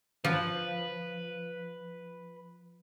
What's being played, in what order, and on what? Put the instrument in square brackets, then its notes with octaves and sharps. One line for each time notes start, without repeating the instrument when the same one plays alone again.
[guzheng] F3 [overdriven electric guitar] B4